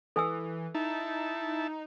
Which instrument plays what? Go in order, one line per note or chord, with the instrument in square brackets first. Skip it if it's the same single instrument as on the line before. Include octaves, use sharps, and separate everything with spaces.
[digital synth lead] E3 [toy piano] A4 G#5 E6
[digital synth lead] D#4 [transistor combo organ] E4 A5